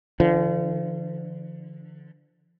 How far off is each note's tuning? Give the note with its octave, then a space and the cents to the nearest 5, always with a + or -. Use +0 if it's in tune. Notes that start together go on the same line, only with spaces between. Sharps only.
D3 +10 F3 -40